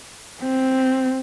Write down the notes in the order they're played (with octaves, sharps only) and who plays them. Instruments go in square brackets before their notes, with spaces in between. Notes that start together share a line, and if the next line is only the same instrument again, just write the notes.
[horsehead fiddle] C4